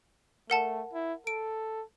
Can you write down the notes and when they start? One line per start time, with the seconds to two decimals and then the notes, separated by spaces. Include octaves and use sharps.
0.50 A3 A#4 F#5 A5
0.93 E4
1.27 A4 D7